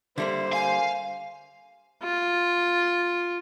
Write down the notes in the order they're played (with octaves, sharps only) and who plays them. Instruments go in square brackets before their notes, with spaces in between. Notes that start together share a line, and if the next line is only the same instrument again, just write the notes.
[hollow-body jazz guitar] D3 G3 A#3 [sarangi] C5 [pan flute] E5
[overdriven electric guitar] F5 [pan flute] G#5
[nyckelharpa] F4